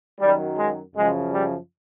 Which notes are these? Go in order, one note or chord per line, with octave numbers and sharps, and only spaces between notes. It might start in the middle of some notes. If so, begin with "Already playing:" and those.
F#2 D#3 F#3 G3
G#3
F#2 C#3 F3 G#3
G3